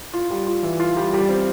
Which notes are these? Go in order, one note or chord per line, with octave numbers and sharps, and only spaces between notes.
F4
G3
F4
E3
F4
G3
G3
C4